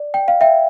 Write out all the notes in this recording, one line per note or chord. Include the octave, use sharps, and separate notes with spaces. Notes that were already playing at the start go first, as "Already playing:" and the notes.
Already playing: D5
G5
F5
E5 G5